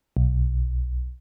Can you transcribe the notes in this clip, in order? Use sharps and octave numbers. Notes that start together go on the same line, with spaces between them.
B1